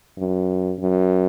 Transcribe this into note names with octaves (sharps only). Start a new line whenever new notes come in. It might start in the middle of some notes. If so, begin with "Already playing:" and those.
F#2
F#2